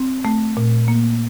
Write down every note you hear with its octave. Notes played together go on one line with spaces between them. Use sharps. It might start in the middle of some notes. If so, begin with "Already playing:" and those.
Already playing: C4
A3
A#2
A#3